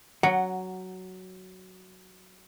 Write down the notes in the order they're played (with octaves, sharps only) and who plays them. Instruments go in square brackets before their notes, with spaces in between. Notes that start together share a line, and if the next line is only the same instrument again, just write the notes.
[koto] F#3 [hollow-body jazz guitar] F#5